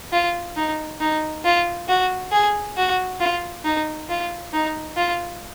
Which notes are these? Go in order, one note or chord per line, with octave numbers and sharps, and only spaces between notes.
F4
D#4
D#4
F4
F#4
G#4
F#4
F4
D#4
F4
D#4
F4